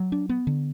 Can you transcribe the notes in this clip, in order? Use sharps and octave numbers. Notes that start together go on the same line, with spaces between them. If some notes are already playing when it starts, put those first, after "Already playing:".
Already playing: F#3
D4
B3
D3